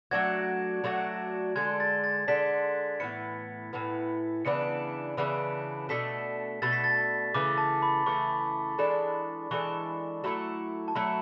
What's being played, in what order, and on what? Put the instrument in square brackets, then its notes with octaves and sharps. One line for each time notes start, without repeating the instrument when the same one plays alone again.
[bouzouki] F#3 A3 D4 F#4 [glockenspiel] G#6
[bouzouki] F#3 A3 D4 F#4
[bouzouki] D3 G#3 D4 A4 [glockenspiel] G#6
[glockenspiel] A6
A6
[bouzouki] D3 G#3 D4 A4 [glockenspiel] B6
[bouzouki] A2 E3 B3 [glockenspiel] C#7
[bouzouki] A2 E3 B3
[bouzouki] C#3 E3 B3 D4 [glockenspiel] C#7
[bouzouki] C#3 E3 B3 D4
[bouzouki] B2 A3 D4 A4 [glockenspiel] B6
[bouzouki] B2 A3 D4 A4 [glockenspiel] A6
[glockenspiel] B6
A6
[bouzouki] C#3 E3 A3 [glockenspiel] D6
[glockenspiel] A5
B5
[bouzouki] C#3 E3 A3 [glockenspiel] C#6
[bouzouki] E3 G#3 D4 A4
[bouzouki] E3 G#3 D4 A4 [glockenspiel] C#6
[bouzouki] F#3 A3 E4 A4
[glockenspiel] A5
[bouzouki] F#3 A3 E4 A4 [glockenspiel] B5